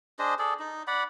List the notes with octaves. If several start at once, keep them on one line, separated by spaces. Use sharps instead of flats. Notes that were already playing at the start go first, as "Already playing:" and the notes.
D4 G#4 C5 D#5
G#4 A4 D5
D#4
D5 F#5 B5